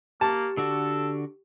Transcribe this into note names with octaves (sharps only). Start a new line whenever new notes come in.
A#3 G4 A5
D3 D4 F#4 A4